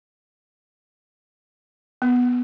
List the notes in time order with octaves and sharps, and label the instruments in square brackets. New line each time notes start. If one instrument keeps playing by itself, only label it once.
[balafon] B3